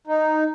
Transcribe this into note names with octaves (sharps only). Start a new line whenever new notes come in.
D#4